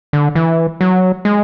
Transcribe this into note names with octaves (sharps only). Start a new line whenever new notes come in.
D3
E3
F#3
G#3